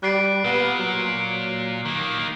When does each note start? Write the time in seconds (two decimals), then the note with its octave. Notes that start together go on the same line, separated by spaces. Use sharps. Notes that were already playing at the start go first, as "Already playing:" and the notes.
0.03 G3 F#6 C7 D7
0.45 A#2 B3
0.79 F#3
1.85 D#3 A#3